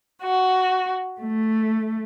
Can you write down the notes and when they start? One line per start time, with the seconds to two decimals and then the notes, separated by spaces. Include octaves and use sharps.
0.22 F#4
1.20 A3